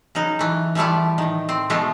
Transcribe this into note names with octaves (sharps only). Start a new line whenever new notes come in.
C#3 F#3 D#4
E3 A3
E3 F3 G3 A3 E4
A2 D#3
C4
B2 F3 G#3 A3